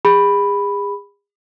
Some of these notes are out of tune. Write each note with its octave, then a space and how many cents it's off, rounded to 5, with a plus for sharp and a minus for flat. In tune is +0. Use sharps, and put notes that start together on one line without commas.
G#4 -40 B5 +0